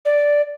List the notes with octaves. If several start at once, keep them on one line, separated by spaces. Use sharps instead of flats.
D5